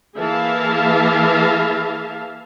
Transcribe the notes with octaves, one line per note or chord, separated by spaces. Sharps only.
E3 A#3 G#4 E5 F5 A5